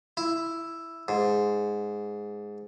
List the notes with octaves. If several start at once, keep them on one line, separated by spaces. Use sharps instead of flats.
E4
G#2